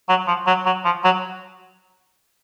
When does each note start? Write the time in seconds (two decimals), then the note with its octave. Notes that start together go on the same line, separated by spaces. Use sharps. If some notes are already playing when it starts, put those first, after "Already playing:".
0.09 F#3
0.27 F3
0.47 F#3
0.66 F#3
0.85 F3
1.04 F#3